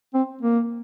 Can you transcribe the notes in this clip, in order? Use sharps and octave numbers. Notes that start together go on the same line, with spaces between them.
C4
A#3